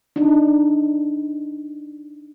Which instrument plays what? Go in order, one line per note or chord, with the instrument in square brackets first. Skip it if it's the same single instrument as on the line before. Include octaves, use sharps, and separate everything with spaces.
[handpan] D4 D#4